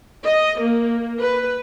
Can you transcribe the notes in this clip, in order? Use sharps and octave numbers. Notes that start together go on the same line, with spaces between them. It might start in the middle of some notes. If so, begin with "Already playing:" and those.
D#5
A#3
B4